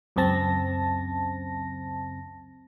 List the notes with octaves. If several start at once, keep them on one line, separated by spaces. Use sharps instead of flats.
C#2 F#2 C#3 C4 A5 A#6